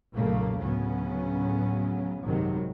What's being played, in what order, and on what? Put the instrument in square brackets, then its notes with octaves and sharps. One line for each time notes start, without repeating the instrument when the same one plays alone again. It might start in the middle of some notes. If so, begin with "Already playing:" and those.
[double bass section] B1 F#2 A#2 C#3 A3 A#3
D2 A2 C#3 F#3 B3 C#4
G#1 F#2 C3 D#3 F#3